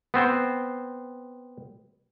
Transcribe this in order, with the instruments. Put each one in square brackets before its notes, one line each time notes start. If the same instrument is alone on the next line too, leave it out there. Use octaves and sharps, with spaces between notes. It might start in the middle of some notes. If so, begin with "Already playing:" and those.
[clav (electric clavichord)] B3 C4 C5